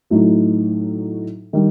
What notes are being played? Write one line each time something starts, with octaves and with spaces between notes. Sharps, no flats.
A2 F#3 A3 D#4
D#3 G3